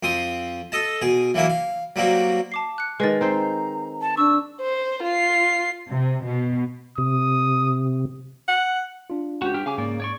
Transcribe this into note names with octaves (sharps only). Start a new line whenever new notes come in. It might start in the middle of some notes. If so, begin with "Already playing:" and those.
F2 C4 C6 D#6
A4 D#5 A5
B2 G#4
E3 F#3 A#3 E4 A#4
F5
F#3 G3 A#3 C4 F#4
A5 D6 C7
F#6 C#7
D#3 G#3 B4 D#5 A6
C4 D#4 C5 A#5
A5
D4 C#6 E6
C5
F4 C7
C3
B2
C3 D#6
F#5
D4 F4
C#2 F#4 G4
G2 G4 G5 F6
C#3 F5 G#5 D6
G#2 A#3 D5
C#5 D5 C#6